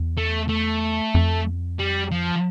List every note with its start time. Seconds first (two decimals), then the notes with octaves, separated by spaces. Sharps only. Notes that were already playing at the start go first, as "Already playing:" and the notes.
Already playing: E2
0.18 A3
0.49 A3
1.15 F2
1.79 G3
2.11 F3